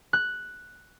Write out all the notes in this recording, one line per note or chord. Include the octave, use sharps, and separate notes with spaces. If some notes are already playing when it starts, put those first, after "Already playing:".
F#6